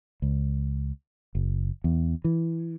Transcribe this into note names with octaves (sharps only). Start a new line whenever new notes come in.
C#2
F#1
E2
E3